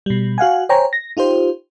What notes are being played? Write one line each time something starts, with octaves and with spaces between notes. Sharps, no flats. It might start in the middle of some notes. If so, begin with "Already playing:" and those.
B2 G3
F#4 F5 F#5 G#5
C5 C#5 G5 G#5 A#5
A#6
D#4 F4 G4 C5